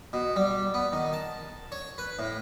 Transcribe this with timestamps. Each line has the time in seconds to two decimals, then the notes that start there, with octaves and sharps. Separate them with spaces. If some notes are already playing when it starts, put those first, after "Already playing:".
0.13 B2
0.36 G3
0.74 B3
0.93 D#3
1.13 A5
1.72 C#5
1.98 B4
2.19 A2